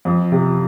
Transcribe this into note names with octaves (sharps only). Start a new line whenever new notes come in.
F2
C3